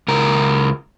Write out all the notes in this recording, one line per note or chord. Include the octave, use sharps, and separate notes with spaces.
C#2 A#4